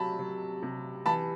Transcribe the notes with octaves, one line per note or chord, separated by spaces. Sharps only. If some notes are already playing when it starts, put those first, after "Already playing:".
Already playing: C3 F#3 A5 B5
F#3
C3
E3 A5 B5